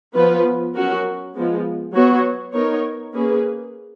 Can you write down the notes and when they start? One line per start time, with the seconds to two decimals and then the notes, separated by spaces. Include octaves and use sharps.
0.15 F3 B3 F4 B4
0.74 F#3 C#4 F#4 A#4
1.35 F3 G#3 B3
1.95 F#3 B3 F#4 C#5
2.54 B3 D#4 A#4 C#5
3.14 A#3 C#4 G#4 B4